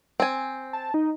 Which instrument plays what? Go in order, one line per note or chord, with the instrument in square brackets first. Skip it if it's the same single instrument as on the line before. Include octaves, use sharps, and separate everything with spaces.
[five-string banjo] C4 G#5
[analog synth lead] A5
D#4